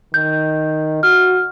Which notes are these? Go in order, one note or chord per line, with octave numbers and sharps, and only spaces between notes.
D#3 G6
F#4 F6